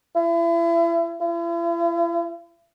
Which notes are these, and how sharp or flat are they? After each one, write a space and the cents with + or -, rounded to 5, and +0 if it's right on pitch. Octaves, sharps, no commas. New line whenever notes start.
E4 +35
E4 +45